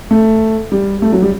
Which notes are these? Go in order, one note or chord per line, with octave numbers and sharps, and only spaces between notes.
A3
G3
A3
F#3
G3